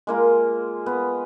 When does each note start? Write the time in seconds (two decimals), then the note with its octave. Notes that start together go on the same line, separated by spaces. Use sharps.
0.07 G#3 A#3 F4
0.86 B3